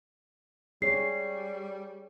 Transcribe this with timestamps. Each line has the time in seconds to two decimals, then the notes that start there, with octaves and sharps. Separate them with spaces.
0.82 G3 G#4 C#5 C7